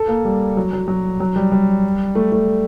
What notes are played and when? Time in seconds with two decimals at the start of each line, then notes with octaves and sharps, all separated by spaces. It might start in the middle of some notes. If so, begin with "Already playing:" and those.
Already playing: A4
0.08 A#3
0.25 G3
0.57 F#3
0.73 F#3
0.88 F#3
1.20 F#3
1.36 G3
1.52 G3
2.15 A3
2.32 A3